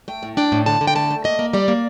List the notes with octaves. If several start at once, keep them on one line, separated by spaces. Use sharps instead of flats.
A3 G5
A2
D4 G5
A2
D3 A5
D3
G5
A3 A5
A3
A#3 D#5
A#3
G3 D5
A#3